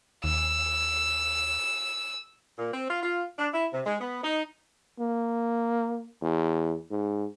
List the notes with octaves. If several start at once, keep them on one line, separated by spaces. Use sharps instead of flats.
D#2 E6
A#2
C4
F4
F4
D4
E4
C3
G#3
B3
D#4
A#3
E2
G#2